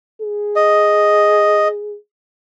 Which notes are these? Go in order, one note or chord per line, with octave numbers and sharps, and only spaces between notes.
G#4
D#5